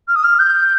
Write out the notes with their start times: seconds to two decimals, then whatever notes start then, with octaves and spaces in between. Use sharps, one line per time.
0.08 F6
0.15 D#6
0.23 F6
0.39 G6